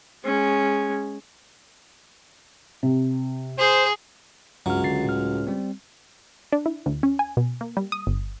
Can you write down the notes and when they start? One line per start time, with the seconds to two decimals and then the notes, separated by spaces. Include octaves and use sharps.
0.24 G#3 C#4
2.83 C3
3.59 G#4 C5
4.66 C#2 G2 F#3 F6
4.84 D3 A6 C7
5.05 A2 F6
5.47 G3 C4
6.52 D4
6.66 E4
6.86 D2
7.03 C#4
7.19 G#5
7.37 B2
7.61 A#3
7.77 G3
7.92 D#6
8.07 G1